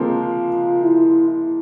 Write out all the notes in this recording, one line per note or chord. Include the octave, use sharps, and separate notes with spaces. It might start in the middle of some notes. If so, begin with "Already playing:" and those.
Already playing: F3 G#3 A#3 C4 F4
E4
E4